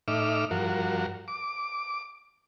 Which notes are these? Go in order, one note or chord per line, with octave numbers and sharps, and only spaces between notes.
A2 D#4 E5 D6 F6
G2 F3 F#4 A#4
D6